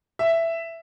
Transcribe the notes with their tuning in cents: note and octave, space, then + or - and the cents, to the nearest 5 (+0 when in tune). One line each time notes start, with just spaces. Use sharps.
E5 +5